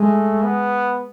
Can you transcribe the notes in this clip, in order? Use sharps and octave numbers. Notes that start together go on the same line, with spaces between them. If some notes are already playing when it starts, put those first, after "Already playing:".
Already playing: G#3 A3
B3